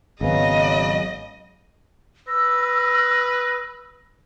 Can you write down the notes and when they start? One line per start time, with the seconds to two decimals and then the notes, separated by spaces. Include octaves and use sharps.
0.21 G#1 C#3 F#3 B3 D#5
2.28 B4 E6 A#6